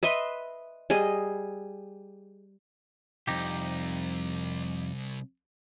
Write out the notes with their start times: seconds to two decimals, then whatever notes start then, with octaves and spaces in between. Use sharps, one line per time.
0.03 B4 D#5 E5 C6
0.90 G3 G#4 D#5
3.28 C2 F2 D#4 G4